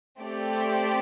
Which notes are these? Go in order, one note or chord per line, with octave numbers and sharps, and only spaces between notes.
A3 C4 G4 D5